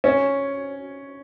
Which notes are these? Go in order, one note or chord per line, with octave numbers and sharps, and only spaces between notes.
C#4